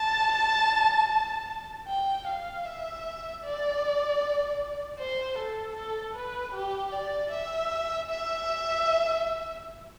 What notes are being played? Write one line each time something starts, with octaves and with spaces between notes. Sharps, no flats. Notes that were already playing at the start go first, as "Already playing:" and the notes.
Already playing: A5
G5
F5
E5
D5
C5
A4
A4
B4
G4
D5
E5
E5